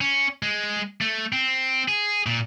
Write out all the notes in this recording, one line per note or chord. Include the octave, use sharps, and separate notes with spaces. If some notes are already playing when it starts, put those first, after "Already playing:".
C#4
G#3
A3
C4
G#4
A#2